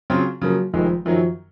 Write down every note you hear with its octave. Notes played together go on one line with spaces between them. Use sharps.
C#3 F#3 C4 F4
C#3 F3 F#3 A#3
F1 F2 D#3 F3 G#3
F#2 D#3 F3 F#3